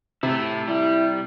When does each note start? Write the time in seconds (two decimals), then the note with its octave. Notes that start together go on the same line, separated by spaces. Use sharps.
0.23 C3 A3 E4
0.68 G3 E4